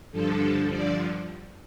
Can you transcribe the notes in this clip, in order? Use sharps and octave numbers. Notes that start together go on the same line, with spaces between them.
G2 D3 F3 A4
D5